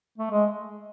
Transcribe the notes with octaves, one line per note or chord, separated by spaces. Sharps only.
A3
G#3